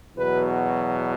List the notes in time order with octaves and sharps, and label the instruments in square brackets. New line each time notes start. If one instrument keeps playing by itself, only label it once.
[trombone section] E2 B2 F#3 B4